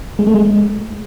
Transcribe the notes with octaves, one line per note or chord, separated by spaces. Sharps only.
G#3
A3
G#3